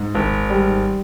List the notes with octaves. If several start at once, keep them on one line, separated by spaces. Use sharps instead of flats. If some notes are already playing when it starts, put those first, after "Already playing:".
Already playing: G#2
G#1
G3